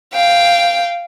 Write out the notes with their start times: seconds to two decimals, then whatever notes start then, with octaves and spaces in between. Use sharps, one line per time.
0.13 F5 G5